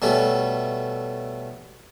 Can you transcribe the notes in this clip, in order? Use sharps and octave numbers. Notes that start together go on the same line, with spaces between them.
B2 G3 A3 C#4